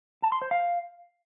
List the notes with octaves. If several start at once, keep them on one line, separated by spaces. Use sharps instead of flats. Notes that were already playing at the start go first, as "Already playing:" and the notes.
A5
C6
C5
F5